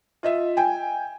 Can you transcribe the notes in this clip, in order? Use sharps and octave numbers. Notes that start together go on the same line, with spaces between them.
F4 D#5 E5
G5 G#5